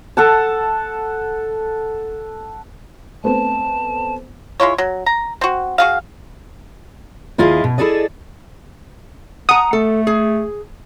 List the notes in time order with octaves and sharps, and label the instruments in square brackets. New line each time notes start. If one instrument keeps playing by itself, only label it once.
[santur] A4 F#5 A5
[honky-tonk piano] A3 B3 C4 [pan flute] A5
[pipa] G#3 E4 F4 C#5
F#3
A#5
C4 F#4
F#4 G#4 F5
[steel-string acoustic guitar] D#2 E4 F4 G#4 D#5 F5
B2
E4 G#4 A4 D5 D#5
[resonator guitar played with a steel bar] F#5 A#5 [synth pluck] D#6
[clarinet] A3 [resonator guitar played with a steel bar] A4
[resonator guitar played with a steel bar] G#4